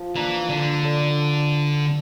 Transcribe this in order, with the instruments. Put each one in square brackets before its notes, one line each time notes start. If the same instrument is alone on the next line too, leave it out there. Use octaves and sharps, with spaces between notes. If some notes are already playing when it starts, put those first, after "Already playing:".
Already playing: [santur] F3
[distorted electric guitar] E3 [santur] A#3 D4
[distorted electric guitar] D3 [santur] D4
[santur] A4 D5